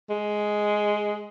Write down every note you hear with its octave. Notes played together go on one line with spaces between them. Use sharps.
G#3